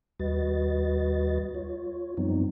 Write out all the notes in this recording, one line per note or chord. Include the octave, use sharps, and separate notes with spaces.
D#2 G3 F#4 B4 D#5 A6
F4 C#5
F#2 F3 G3 B3 C4 D#4